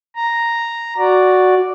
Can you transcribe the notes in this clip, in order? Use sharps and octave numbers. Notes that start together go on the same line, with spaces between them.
A#5
F#4 D5